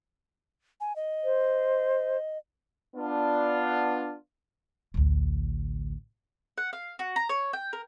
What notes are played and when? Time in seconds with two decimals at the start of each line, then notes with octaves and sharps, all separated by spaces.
0.81 G#5
0.96 D#5
1.23 C5
2.95 B3 D4 F4
4.94 A1 D2
6.58 F#5
6.73 F5
6.99 F#4
7.16 A#5
7.29 C#5
7.53 G5
7.73 A#4